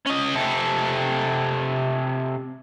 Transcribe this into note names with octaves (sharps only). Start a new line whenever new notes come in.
C#4 D#5
C3 A4